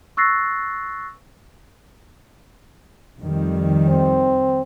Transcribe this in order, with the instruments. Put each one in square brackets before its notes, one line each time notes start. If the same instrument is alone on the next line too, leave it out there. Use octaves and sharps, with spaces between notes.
[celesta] C#6 E6 F#6 A6 A#6 C7
[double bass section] F2 D#3 G3
[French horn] C4